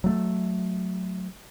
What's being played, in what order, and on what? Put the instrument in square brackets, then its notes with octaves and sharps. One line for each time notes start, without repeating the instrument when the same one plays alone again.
[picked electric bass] F#3 A3